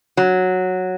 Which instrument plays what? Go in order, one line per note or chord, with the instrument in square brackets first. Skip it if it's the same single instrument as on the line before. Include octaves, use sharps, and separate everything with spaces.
[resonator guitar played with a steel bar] F#3